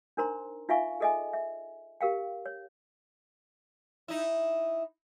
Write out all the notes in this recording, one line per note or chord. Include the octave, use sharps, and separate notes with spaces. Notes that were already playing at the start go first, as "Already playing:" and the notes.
D4 D#4 A#4 C5 A#5 C6
D#4 F4 E5 F5 G#5 C#6
G#4 A4 D#5 E5 G#5
E5
G4 A#4 F5 G5
C#5
D#4 E4